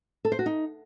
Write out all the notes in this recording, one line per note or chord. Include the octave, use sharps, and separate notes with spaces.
A4
C5
F#4
D#4